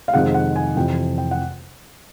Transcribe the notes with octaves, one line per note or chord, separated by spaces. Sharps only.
F5
F2 C3 D#3 G#3 F#5
F#5
G#5
F2 C3 E3 G5
G5
F#5